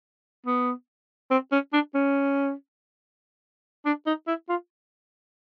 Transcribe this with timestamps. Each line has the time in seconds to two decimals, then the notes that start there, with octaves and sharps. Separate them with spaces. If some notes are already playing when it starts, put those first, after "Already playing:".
0.46 B3
1.31 C4
1.52 C#4
1.73 D4
1.94 C#4
3.85 D4
4.06 D#4
4.27 E4
4.49 F4